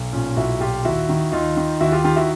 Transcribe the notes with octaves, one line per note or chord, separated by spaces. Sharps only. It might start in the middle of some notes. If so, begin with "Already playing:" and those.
Already playing: B1
A#2 C#4
B1 E4 F#4
A#2 F4 G4
D#2 E4 F#4
D#3
D#2 D#4 F4
D#3
D#2 E4 F#4
F4 G4
D#3 F4 G4
E4 F#4